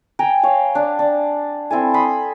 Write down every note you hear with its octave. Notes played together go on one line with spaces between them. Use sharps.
G5 G#5 A#5
C#5 F5
D4
D4
C4 E4 A4 G#5
B5 C6 D#6